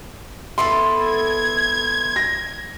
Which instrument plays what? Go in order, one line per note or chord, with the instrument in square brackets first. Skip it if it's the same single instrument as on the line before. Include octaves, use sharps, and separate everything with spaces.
[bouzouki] B3 E4 A4 [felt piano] C6
[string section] G#6
[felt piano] A#6